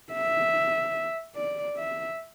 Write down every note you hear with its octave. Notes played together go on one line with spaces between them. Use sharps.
E5
D5
E5